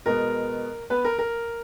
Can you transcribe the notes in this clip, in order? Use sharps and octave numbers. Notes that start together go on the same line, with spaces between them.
B2 G#3 B3 A#4
B3 B4
A#4
A#4